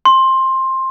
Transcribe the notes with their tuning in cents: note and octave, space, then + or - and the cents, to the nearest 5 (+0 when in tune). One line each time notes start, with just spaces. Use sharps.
C6 +15